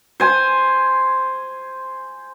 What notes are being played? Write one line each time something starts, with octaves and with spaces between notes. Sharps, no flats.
C5 G#5